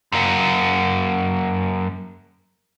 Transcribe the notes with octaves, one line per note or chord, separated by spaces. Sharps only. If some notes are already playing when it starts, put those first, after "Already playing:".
F#2 A#3